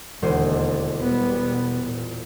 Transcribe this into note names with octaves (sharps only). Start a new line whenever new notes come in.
E1 D#2 D3 G#3 C5
B2 G3 B3
A#2